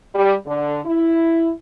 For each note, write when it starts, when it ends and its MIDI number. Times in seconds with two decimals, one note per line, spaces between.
0.15 0.34 55
0.47 0.80 50
0.85 1.50 64